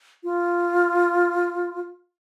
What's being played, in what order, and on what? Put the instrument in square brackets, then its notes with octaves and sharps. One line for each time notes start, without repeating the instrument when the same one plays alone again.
[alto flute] F4